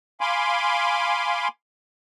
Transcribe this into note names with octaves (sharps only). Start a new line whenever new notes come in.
F5 G#5 B5 C6 D6